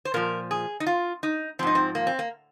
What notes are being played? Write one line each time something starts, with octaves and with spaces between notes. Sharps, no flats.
C5
A#2 F3 A#4
G#4
D#4
F4
D#4
G#2 F3 C4 D#4
C4
A#3
C4
A#3